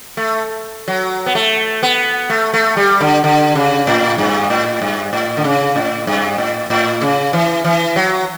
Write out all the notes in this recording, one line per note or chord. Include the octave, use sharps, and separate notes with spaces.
A3
F#3
B3
A3
B3
A3
A3
G3
D3
D3
C#3
A2
G2
A2
G2
A2
D3
C#3
A2
G2
A2
A2
C#3
E3
E3
F#3